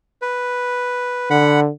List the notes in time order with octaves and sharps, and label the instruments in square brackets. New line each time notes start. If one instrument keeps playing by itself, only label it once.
[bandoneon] B4
[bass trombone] D3 [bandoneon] F#5 B5